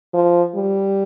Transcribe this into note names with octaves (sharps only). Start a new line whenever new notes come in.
F3
G3